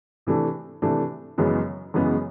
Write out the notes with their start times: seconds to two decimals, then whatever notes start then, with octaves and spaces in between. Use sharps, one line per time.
0.27 C3 E3 A3 D4
0.82 C3 E3 A3 D4
1.38 F#2 C#3 E3 G#3 B3
1.94 F#2 C#3 E3 G#3 B3